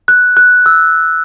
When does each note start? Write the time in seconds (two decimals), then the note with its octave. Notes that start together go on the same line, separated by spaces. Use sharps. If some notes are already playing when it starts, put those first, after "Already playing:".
0.08 F#6
0.37 F#6
0.66 E6